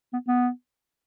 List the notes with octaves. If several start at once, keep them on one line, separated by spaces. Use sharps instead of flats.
B3
B3